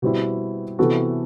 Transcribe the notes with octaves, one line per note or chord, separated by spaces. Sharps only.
B2 G3 C4 E4
C3 E3 B3 F#4 A4